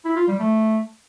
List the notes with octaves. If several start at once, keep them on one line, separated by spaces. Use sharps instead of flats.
E4
F4
G3
A3